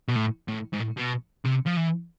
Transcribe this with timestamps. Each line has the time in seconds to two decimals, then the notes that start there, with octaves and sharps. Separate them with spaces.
0.08 B2
0.16 A2
0.48 A2
0.73 G#2
0.80 A2
0.97 B2
1.45 C3
1.66 F3
1.77 E3